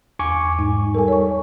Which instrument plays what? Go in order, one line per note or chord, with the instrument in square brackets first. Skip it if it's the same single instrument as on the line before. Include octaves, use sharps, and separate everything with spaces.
[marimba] E2 [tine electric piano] G#5 C#6 D6
[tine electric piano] G#2 [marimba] D#4
[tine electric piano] G3 A4 [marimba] A#4 G#5
[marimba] C#5 C#6